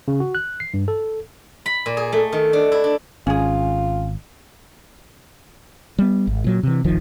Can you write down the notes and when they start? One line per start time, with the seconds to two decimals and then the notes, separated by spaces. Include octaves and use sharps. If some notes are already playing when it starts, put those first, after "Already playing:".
0.08 C#3
0.20 F#4
0.35 F#6
0.60 C7
0.74 G2
0.88 A4
1.66 B5
1.86 A#2
1.97 G#4
2.12 A3
2.32 D#3
2.53 D4
2.72 E4
2.84 D4
3.27 G#1 C#4 F4 G#4
5.99 G3 B3
6.27 G#1
6.44 A#2 F#3
6.63 C3 E3
6.84 D1 G#1 D#3 F3